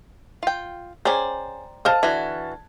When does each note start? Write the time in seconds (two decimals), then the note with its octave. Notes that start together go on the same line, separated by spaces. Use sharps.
0.43 F4 G5
1.05 C#4 G#4 C5 D5 G5 A#5
1.85 A4 C5 D#5 F5 A5 F6
2.03 D3 E3 F#4 G#6